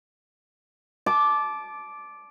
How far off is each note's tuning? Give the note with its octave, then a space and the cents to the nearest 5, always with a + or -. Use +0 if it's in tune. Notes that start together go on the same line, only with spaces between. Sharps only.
A5 -25 D6 +0